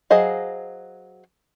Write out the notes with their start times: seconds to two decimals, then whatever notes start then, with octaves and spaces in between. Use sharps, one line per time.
0.10 F#3 G#4 C5 D#5 F5